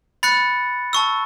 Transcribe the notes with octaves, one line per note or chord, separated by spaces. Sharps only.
B5 F#6 A6 C#7
A5 C#6 E6